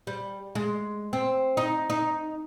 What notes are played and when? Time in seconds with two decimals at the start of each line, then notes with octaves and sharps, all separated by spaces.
0.07 G3
0.55 G#3
1.13 C4
1.57 D#4
1.90 D#4